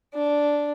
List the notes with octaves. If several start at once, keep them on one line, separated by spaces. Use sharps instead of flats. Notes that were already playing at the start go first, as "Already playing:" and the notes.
D4